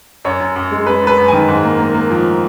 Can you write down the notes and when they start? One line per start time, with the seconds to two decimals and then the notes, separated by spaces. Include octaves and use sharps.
0.25 F#2 C#5
0.40 F#2
0.56 F#2
0.71 G#3
0.86 G#3 B4
1.02 F#2 B4
1.18 F#2
1.28 D#3 G#5
1.48 G#2
1.63 A#3
1.79 A#3
1.94 A#3
2.10 F3